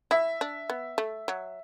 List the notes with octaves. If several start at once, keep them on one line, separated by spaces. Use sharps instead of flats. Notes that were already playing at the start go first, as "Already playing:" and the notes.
E4 E5
D4
B3
A3
F#3